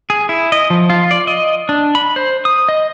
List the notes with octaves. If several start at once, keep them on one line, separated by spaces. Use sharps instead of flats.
G#4
E4
D#5
F3
F4
D5
D#5
D4
B5
C5
D#6
D#5